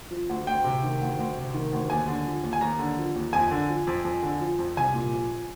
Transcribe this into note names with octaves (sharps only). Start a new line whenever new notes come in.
F3
D2
D2 G5
C3
D#3
D2
D2
C3
D#3
D2
D#2 G#5
D3
F3
D#2
G#5
D#2 A#5
D3
F3
D#2
F2 G#5
D3
F3
F2
F2
D3
F3
F2
C2 G#5
A#2
F3